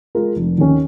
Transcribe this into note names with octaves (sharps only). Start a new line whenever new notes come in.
G#3 F4 A#4
F1
D#2 D#3 C#4